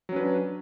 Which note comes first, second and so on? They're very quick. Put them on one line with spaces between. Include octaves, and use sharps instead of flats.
F#3 C#4 B4 D4